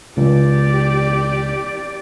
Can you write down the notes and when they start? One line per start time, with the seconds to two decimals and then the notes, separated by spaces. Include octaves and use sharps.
0.17 C#2 G4 D5